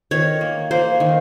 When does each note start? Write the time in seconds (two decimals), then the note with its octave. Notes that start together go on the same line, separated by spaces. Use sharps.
0.11 D#3 C#5
0.41 A#3
0.71 A#3 C5
1.00 D#3